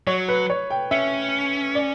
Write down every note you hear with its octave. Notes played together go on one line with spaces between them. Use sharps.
F#3 C#5
B4
C#5
G5
C#4 E5
D5